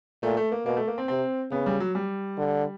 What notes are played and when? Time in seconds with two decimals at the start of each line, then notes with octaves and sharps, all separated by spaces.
0.23 A#2 A3
0.37 A3
0.52 A#3
0.66 B2 A#3
0.77 A3
0.87 A#3
0.98 C4
1.08 C3 C4
1.51 C#3 B3
1.66 G3
1.80 F#3
1.95 G3
2.38 D3